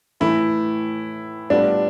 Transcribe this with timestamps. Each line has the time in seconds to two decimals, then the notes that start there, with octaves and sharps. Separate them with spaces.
0.20 A2 E3 A3 E4
1.50 A2 G3 B3 D4 F4 A4